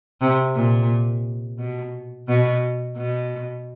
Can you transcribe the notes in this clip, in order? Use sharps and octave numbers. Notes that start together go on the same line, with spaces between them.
C3
A#2
B2
B2
B2